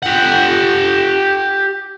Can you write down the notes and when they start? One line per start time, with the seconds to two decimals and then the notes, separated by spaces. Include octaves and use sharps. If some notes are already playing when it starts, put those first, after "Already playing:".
0.03 G4 F#5